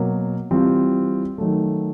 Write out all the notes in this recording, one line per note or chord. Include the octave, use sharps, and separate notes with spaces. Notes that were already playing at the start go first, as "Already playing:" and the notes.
Already playing: B2 F#3 A#3
E3 G3 C4 F4
D#3 F#3 A3